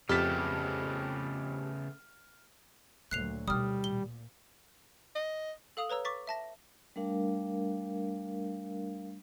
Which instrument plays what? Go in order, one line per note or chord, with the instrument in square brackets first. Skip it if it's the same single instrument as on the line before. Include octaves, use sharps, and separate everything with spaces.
[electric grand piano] F2 B6 [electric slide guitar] C#3 A3 B3 [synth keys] G4 A5 [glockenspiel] F6
[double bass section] D2 A#2 F#3 [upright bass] A#3 [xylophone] F#6 C7 F7
[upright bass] B2 D#3 [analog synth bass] G3 [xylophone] D#6 F6
[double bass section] A#2 [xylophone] G7
[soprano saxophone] D#5
[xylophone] A4 F5 D#6 F7
B4 C#5 A#5 E6
C#6 D6 A6 B6
E5 A5 A#6
[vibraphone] G3 A3 D4 A#4 F5